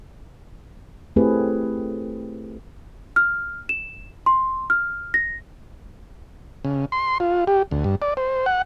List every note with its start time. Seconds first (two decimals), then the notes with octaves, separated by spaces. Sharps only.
1.16 A3 C4 E4 G4 G#4 B4
3.16 F6
3.69 E7
4.26 C6
4.70 F6
5.14 A#6
6.65 C#3
6.92 C6
7.20 F4
7.47 G4
7.71 D2
7.84 G2
8.02 D5
8.17 C5
8.46 F#5